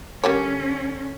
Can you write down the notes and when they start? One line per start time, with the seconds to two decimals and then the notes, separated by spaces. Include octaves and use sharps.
0.24 D3 G3 A#3 C#4 C#5